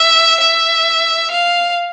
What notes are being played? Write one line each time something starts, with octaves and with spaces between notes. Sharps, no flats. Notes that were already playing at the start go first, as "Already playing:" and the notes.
Already playing: E5
E5
F5